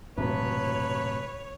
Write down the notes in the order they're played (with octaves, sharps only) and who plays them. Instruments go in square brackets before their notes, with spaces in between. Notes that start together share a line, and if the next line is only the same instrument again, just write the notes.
[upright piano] E1 [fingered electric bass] F#2 A2 C3 [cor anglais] B4 [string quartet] C#5